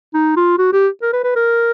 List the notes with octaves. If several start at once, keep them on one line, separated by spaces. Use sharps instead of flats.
D#4
F4
F#4
G4
A#4
B4
B4
A#4